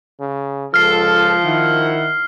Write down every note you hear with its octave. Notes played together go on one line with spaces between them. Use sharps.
C#3
C#2 F3 A4 F6 C7
D#3 E4 F#5